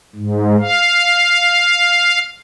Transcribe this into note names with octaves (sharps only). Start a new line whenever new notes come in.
G#2
F5